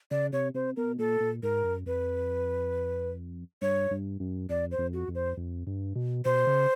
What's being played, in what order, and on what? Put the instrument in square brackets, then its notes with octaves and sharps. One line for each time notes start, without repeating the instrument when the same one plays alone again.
[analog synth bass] C#3 [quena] D5
[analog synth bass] C3 [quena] C#5
[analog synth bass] C3 [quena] C5
[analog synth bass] B2 [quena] A#4
[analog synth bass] A#2 [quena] A4
[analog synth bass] A#2
[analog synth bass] G#2 [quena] A#4
[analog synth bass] F#2
[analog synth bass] F2 [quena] B4
[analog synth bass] G2 [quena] C#5
[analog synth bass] G2
F#2
[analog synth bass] F2 [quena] D5
[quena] C5
[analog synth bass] F2
[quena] F#4
[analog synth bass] F2
[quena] C5
[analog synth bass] F2
G2
B2
[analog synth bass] B2 [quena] C5
[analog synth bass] C#3